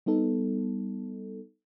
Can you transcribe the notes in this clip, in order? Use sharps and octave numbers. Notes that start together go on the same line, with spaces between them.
G3 B3 D#4 A4